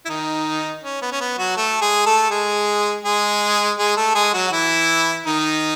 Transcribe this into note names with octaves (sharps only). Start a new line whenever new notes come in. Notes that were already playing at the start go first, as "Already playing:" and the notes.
E4
D#3 D#4
C#4
B3
C#4
B3
F#3 F#4
A3 A4
G#3 G#4
A3 A4
G#3 G#4
G#3 G#4
G#3 G#4
A3 A4
G#3 G#4
F#3 F#4
F#4
E3 E4
D#3 D#4